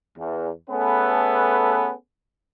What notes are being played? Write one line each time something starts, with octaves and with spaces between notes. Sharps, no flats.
E2
A3 B3 C#4 G#4 A4 B4